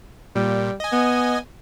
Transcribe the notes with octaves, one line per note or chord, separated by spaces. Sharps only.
A#2 G3
D#5 G#5
B3